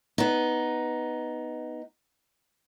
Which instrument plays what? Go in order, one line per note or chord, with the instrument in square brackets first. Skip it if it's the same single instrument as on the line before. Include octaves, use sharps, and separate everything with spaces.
[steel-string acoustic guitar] B3 D#4